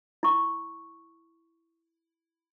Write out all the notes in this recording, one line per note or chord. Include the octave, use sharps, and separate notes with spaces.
E4 C#6